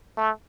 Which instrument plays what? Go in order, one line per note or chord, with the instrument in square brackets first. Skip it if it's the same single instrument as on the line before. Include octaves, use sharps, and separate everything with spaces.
[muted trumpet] A3